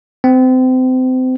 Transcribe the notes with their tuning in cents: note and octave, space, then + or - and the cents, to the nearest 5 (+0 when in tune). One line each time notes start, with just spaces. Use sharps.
C4 -30